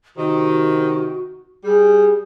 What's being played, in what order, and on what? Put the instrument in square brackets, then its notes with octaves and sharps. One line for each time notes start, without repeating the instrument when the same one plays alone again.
[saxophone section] C3 D#3 [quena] F#4
[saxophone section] G3 [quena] G#4